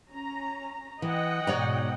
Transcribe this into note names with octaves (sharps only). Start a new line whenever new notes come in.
C#4 A#5
E3 D#5 F#5 G5
G#2 B2 C#5 D5 A#5